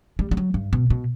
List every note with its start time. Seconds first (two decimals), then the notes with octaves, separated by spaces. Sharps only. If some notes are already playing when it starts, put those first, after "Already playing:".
0.19 G3
0.31 G3
0.37 F#3
0.54 G2
0.73 B2
0.90 B2